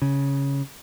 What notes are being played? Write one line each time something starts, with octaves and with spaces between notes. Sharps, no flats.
C#3